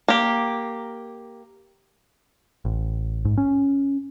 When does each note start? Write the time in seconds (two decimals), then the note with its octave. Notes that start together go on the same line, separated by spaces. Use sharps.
0.08 A#3 G4
2.65 A1
3.25 G#2
3.38 C#4